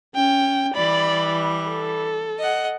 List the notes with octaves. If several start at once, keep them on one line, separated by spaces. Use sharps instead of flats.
C#4 G5
E3 G3 D5 B5
A4
D#5 F#5